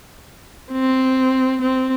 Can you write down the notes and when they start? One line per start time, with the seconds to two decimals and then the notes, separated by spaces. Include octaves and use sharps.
0.72 C4
1.61 C4